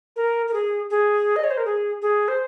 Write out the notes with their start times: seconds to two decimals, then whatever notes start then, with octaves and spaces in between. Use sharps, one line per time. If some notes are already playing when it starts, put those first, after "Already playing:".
0.16 A#4
0.48 A#4
0.54 G#4
0.90 G#4
1.36 D#5
1.44 C#5
1.50 C5
1.57 A#4
1.65 G#4
2.02 G#4
2.28 C5